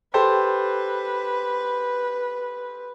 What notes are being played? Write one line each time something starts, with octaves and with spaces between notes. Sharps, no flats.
G4 A4 B4 C5